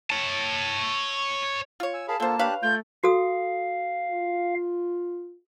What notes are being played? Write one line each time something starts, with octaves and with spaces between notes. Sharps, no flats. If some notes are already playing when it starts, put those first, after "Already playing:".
C#5 A5
F4 C#5
G#5 E6
G#4 A#4 F5 A5 B5
D3 A#3 F4 A4 C5 A5
D4 G4 B4 C#5 F5 F#6
A3 F4 G6
F#4 A4 F5 D#6
F4